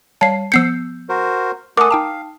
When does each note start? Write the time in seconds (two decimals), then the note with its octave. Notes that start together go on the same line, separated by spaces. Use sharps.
0.21 G3 C#5 F5 A5 C7
0.52 F3 B3 E6 G6 C7 C#7
1.09 F#4 A#4 C5
1.77 A3 A4 A#4 F#5 G#5 D6 D#6
1.91 D#4 F5 G5 A5